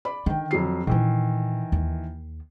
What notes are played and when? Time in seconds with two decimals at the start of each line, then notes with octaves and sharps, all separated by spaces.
0.05 D5 B5
0.26 D3 D#3 G5
0.51 F2 F#3 C7
0.87 A#2 D#3 E3 C#4
1.72 D#2